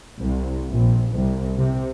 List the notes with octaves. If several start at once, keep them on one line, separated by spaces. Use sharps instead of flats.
C2
A#1
C2
C3